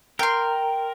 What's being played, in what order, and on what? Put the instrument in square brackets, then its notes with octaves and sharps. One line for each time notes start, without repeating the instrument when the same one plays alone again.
[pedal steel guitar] A#4 [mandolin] G5 C6